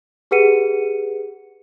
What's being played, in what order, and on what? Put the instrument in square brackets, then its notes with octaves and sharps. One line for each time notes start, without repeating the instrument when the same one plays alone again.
[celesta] G4 G#4 B4 F#5 C#7 D#7